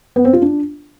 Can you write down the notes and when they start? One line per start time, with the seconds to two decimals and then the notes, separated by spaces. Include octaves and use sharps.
0.16 B3
0.25 C4
0.33 F4
0.42 D4